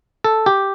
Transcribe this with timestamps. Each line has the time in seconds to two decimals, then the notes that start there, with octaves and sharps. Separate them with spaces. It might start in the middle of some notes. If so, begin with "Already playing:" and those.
0.24 A4
0.46 G4